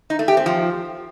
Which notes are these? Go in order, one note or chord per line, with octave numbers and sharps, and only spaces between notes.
D#4
A3
G4
C4
F3